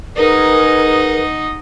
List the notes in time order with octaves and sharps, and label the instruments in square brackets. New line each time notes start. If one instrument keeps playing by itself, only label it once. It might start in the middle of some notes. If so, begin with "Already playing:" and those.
[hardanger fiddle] D#4 F#5 [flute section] G#4 A#4 [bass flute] B4 [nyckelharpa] D#5 D#6